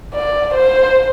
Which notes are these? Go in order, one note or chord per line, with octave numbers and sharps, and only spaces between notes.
D5
C5